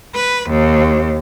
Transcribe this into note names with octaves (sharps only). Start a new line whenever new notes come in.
B4
D#2